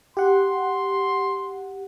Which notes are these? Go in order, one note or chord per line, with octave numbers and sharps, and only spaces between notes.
G4 F#5 C6